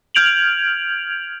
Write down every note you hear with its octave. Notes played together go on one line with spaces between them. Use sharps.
F6 G6 G#6 D7 F7 F#7